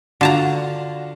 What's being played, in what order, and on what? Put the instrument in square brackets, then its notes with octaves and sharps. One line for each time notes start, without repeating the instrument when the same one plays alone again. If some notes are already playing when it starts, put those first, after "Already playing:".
[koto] D3 A5 A#5 [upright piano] D4 F4 F#4